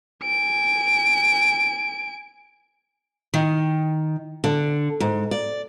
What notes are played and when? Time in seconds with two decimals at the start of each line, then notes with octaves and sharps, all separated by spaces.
0.24 G#5 D7
3.34 D#3
4.44 D3
5.00 G#2
5.31 D5